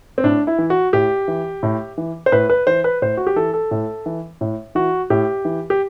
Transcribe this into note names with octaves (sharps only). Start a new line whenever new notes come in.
C4
A2 D4
E4
E3
F#4
A2 G4
E3
A2
E3
C5
A2 B4
B4
E3 C5
B4
A2 C5
F#4
G4
E3 A4
A4
A2
E3
A2
E3 F#4
A2 G4
E3
G4